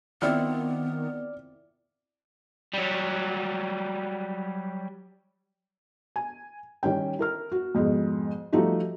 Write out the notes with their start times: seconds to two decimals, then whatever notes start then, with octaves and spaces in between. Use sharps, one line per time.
0.22 D#3 B3 C4 E4 F4 D5 F6
2.74 F#3 G3
6.16 G#5
6.83 D#3 G3 C#4 G5
7.19 E4 A#4 F6
7.52 F#4
7.75 F2 G#2 B2 G#3
8.52 F3 G3 A3 D#4 F#4 G4